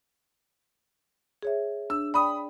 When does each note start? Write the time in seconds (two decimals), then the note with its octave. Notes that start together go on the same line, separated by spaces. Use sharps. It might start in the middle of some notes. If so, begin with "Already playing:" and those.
1.43 G#4 C#5 E5
1.90 D4 E6
2.14 D5 G5 B5 D#6